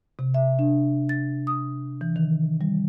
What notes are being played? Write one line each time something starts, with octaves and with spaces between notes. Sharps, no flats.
C3
E5
D4
A6
D#6
E3
D#3
G3